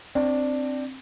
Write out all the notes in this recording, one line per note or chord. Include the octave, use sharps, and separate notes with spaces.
C4 D4